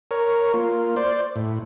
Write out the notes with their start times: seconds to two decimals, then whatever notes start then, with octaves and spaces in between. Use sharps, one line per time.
0.11 A#4 C#5
0.54 A#3 F4
0.96 C5 D5
1.36 A2